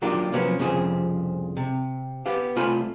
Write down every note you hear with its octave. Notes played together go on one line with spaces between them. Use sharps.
D#3 F#3 A#3 D4 F4 G4
C3 F3 F#3 A#3 B3 C#4
C2 F2 C#3 F3 G#4
C3
B3 G4 F5
C2 A3 F4 G#5 B5